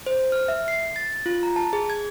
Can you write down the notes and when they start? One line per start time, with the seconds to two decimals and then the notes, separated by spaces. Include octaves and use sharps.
0.06 C5
0.32 F6
0.48 E5
0.68 C7
0.96 A6
1.26 F4
1.43 A#5
1.56 A5
1.73 G#4
1.90 G#6